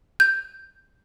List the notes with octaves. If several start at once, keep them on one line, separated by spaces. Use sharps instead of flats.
G6